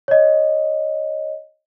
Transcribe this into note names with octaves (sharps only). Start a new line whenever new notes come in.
C#5 D#5